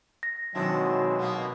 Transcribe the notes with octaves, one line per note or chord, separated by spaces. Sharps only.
A#6
B2 D#3 F#3 G#3 C4 D4 E4
B2 A#3 B3